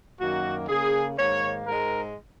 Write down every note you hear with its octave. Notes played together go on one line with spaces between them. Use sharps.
F#2 D#3 A#3 F#4
C#3 A#3 G#4
G#2 D#3 A#3 C#5
G#2 G#3 A#4